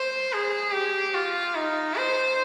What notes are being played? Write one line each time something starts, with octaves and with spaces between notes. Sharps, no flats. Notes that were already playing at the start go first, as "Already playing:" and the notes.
Already playing: C5
G#4
G4
F4
D#4
C5